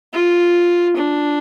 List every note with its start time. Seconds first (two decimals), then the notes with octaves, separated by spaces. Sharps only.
0.13 F4
0.96 D4